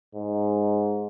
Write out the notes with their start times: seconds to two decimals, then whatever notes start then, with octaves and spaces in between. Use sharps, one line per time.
0.15 G#2